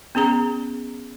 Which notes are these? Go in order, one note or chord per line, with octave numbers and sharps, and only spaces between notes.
B3 C#4 G#4 A#5